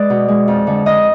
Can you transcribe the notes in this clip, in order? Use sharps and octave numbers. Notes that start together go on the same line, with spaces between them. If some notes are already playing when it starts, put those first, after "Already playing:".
Already playing: G#3 B4 D5
B2
G#3
F2
D3 G#3
F2 D#5